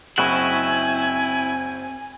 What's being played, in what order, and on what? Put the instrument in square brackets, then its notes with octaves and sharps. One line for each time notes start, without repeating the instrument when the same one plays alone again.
[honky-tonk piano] F#1 B5 C#6 [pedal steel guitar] C4 D#5 F#5 [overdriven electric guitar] E4 [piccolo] G#5